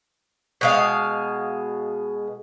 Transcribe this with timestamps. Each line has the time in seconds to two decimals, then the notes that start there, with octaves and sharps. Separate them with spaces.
0.61 B2 G#3 F5